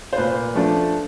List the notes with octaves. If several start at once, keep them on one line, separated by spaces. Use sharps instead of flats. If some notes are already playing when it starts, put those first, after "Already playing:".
C5
A#2 B4
F3 A3 D4